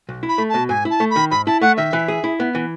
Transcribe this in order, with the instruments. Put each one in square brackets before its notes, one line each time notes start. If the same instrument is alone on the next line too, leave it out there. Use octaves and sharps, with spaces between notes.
[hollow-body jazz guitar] B1
E4
[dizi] B5
[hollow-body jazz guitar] A3
[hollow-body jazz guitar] B2 [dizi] A5
[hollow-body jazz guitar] G#2 [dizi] G#5
[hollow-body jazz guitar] E4
[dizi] A5
[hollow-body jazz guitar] A3
[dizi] B5
[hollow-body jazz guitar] D#3
[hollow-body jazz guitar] G#2 [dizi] B5
[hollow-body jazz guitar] E4 [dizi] A5
[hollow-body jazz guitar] A3 [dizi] F#5
[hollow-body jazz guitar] D#3 [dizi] E5
[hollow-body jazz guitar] E3
G#4
E4
B3
E3